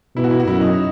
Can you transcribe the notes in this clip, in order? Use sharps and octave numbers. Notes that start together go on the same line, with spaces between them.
B2 E4
F#4
E4
F#4
F#2 E4
D#4